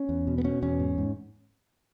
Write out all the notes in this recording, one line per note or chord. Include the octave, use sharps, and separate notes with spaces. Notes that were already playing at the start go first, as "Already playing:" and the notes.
Already playing: C#4
E2
B2
B3
B2 C#4
E2 C#4
G#2
G#2